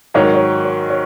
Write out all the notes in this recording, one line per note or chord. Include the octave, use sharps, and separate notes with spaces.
G#2 D#3 F#3 C#5
A#4
C#5
C#5
C#5